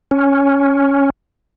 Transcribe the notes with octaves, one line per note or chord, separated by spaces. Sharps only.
C#4